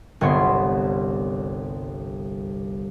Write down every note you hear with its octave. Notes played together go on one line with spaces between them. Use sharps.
G1 C2 B3 C#5 C6